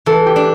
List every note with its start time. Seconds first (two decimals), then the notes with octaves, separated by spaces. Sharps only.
0.06 E3 A4
0.26 G4
0.36 D4